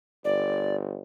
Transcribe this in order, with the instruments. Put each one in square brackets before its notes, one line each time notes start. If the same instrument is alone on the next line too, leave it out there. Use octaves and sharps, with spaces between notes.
[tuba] G1 [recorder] D5